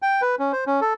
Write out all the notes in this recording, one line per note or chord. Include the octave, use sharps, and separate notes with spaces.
G5
B4
C#4
C5
C#4
A4